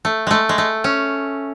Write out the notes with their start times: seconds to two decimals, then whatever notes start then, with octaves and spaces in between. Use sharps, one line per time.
0.05 A3
0.27 G#3 A3
0.49 G#3
0.58 A3
0.84 C#4